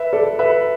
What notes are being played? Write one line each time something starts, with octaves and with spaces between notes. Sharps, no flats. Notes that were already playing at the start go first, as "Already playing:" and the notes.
Already playing: B4 E5
A4 D5
B4 E5